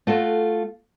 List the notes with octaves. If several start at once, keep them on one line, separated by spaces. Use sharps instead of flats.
A3 F4 F#4 A4